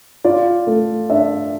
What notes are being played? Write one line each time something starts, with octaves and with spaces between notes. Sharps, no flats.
F4 D5
A3
D4 E5